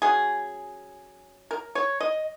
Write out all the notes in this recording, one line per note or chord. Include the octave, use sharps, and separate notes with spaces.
F#3 C#4 G#4
A#4
C#5
D#5